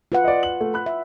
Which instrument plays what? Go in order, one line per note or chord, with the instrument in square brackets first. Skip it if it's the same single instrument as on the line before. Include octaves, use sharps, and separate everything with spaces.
[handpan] F4 B4 F#5
[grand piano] D5 D#5
F#7
A3
B5 F#6
[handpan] E5